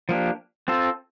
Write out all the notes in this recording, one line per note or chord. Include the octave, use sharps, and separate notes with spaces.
F3 A#3 D4 G4
C4 F4 A4